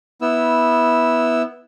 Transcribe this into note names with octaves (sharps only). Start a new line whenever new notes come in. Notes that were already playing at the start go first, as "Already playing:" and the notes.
B3 E4 E6